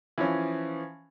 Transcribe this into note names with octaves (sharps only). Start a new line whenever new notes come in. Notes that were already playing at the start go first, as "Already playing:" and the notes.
E3 F3 C#4